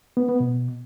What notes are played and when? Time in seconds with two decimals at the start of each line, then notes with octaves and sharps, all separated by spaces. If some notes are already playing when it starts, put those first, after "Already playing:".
0.17 B3
0.29 B3
0.40 B2